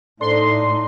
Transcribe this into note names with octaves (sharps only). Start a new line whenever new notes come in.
A2 D4 D#4 A4 C5 D5 C6